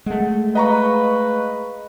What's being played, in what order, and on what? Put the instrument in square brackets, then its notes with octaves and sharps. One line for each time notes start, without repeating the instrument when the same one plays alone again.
[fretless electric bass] G#3 A3 [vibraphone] G#4 F#5
[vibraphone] G#4 F5 [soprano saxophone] B4 [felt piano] D#5 A#5 C#6